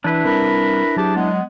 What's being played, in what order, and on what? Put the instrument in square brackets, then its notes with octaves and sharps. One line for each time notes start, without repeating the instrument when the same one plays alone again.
[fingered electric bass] E3 [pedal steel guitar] D4 E4 B4
[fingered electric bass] G3 C4 [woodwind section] A#4 B5
[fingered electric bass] F#3 [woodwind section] G4 G#4 A5
[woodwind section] G#3 B3